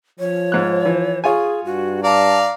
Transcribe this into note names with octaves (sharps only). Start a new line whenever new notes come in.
F3 C#5
G#2 F#6
E3
F4 G#4 C#5 G#5
G2 F#4
D5 F5 A5 A#5